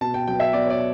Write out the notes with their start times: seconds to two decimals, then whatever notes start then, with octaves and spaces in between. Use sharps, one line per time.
0.01 B2 A5
0.14 G5
0.28 F#3 B3 G5
0.40 E5
0.53 B2 D5
0.66 C#5
0.70 D5